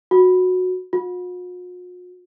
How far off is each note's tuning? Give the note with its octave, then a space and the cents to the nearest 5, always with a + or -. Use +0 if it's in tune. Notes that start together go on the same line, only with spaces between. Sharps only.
F#4 -15
F#4 -45